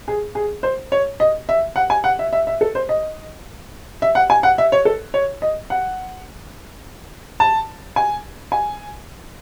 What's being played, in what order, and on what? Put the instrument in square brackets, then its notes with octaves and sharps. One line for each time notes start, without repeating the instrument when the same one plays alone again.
[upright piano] G#4
G#4
C5
C#5
D#5
E5
F#5
G#5
F#5
E5
E5
E5
A4
C5
D#5
E5
F#5
G#5
F#5
E5
C#5
A4
C#5
D#5
F#5
A5
G#5
G#5